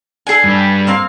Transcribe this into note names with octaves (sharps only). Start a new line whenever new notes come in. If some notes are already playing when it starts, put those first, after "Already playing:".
D4 G#4 A4 G#5
G2 G3
A#3 C4 F5